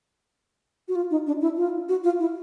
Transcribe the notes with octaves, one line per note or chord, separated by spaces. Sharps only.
F#4
F4
D#4
D4
E4
F4
F#4
F4
E4